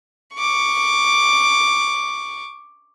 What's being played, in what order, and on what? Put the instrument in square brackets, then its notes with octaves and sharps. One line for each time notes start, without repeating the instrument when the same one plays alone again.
[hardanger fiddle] C#6 D6